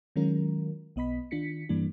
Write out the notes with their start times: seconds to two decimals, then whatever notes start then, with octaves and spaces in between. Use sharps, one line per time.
0.16 D#3 F#3 G#3 C#4 F4 A#4
0.96 B1 B3 D#5 B5 B6
1.31 D#3 D4 F4 B6 C#7
1.69 G2 E3 G3 A#3 D4